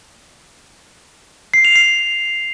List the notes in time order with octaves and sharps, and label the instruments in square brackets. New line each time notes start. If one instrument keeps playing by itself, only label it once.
[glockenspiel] C7
F7
C7